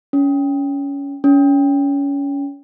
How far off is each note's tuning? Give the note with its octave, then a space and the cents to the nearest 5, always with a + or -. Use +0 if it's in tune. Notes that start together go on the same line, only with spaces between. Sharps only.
C#4 +20
C#4 +25